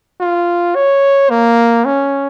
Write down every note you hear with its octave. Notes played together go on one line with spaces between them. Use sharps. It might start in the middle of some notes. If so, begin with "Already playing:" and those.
F4
C#5
A#3
C#4